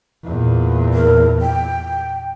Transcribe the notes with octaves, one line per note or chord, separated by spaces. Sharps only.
E2 A#2
A#4
G5